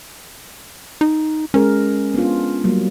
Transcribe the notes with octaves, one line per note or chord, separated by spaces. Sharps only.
D#4
G#3 C#4 G#4 A#4
B3 D4 F4
F#3 G3 A#3